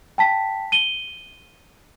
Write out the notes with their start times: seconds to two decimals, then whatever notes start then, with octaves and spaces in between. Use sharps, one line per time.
0.18 G5 A5 B6
0.72 D#7 G7